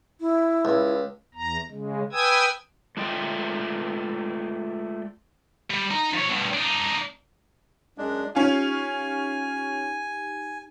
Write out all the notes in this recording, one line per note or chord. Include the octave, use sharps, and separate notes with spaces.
E4
C#2
E2 A#5
C#3 G#3
B4 G5 G#5 D#6 E6 G#6
G#3 A3 F4 D5 G5
G3
D#4 A#5
F3 C#5
G2 B2
D4 D#4
F#2 G#3 D4
C#4 D#4 F4 G4 G#5